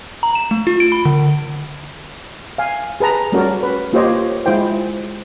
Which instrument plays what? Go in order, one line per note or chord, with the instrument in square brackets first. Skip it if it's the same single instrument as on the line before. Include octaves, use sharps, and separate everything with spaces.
[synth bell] A#5
E7
A3
F4
D7
B5
D3
[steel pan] F5 G#5
G#4 B4 A5 A#5
G3 A3 C#4 F#4 A#4 D5
B4
A#3 F4 G4 C5 C#5 D#5
G#3 E4 F4 C5 G5